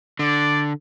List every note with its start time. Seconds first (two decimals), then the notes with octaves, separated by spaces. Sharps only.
0.19 D3 D5